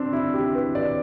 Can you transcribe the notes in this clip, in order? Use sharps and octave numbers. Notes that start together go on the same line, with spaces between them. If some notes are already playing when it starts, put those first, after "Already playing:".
Already playing: C4 D4
E4
G4
B4
D5